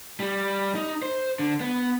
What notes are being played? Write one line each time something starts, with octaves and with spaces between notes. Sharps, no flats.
G3
D#4
C5
D3
B3